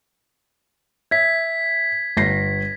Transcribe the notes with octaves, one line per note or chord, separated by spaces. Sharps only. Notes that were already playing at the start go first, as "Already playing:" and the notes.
E5 G#6 B6
G1 A#6 C7